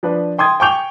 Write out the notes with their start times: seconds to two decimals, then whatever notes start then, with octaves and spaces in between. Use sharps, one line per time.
0.03 F3 D4 B4
0.38 G5 C6 D#6 G#6
0.60 G5 G#5 C#6 D6 G6 F7